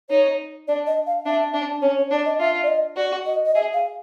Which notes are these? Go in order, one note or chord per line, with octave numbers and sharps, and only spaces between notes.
D#4 C#5
D4 D5
D#5
F5
D4 E5
D4
C#4 C#5
C#5
D4 D5
D#5
F4 E5
D5
D#5
F#4 D5
D#5
D#5
G#4 E5
F5